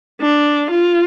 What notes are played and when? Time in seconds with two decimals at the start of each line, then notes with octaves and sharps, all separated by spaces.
0.21 D4
0.71 F4